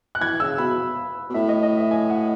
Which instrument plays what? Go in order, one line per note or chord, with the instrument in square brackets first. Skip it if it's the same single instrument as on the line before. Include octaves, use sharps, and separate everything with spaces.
[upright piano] F#6
[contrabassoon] E3 [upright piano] G#6
[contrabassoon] C#3 [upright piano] E6
[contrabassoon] B2 [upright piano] B5
[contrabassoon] B2
[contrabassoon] A2 [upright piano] E5
[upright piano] D#5
D#5
E5
G#5
F#5